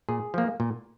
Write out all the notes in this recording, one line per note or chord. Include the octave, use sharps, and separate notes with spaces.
A#2 G#4
F3 A#3
A#2